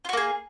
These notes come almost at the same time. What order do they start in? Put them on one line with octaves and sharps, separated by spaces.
F4 F#4 A#3 G#4